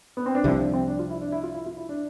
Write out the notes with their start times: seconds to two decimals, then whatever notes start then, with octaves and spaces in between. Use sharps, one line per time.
0.17 B3
0.26 C4
0.35 D4
0.44 C2 C3 F3 E4
0.58 D4
0.74 C4
0.88 D4
0.99 F4
1.10 E4
1.21 D4
1.32 E4
1.43 F4
1.55 E4
1.66 F4
1.77 E4
1.89 D4